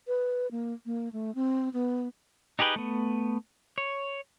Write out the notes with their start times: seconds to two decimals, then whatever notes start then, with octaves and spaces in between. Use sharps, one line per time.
0.07 B4
0.51 A#3
0.86 A#3
1.13 A3
1.35 C4
1.73 B3
2.59 D#4 G4 G#4 B4 G5
2.76 A3 B3
3.78 C#5